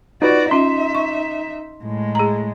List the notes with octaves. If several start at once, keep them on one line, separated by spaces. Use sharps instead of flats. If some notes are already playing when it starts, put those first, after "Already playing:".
D#4 F4 F#4 B4 D5
C#4 D#4 F4 E5 C6
C#6
A2 G#3
G#4 A#5